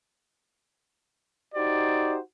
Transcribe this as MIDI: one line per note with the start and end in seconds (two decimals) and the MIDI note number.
1.55 2.18 63
1.55 2.18 66
1.55 2.18 67
1.55 2.18 72
1.55 2.18 74